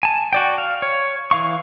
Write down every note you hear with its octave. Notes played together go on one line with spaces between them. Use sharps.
G#5 A5
F#4 D5 G5
F5
C#5
E3 F5 C#6